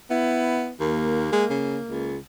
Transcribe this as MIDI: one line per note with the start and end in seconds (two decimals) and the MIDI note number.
0.10 0.72 59
0.10 0.70 64
0.80 1.30 39
0.80 2.12 58
1.33 1.45 56
1.50 1.79 49
1.87 2.18 37